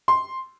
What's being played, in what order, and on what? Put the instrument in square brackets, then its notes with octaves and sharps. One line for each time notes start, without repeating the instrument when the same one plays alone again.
[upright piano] C6